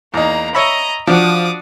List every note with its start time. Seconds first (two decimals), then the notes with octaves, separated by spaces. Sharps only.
0.14 E2 A#3 D#4 A#5
0.55 C#5 D#5 E5 A#5 B5
1.07 F3 D4 F#4 D6 D#6